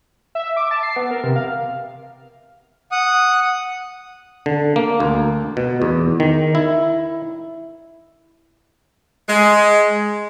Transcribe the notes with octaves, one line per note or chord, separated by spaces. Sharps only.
E5
D6
A5
C7
B3
A#4
C3
F5
F#5 D#6
D3
A#3
D2
B2
E2
D#3
E4
G#3